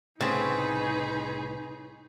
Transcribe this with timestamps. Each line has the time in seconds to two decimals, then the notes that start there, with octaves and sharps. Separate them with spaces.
0.21 C2 A2 C#3 C4 D#4 G#4 B4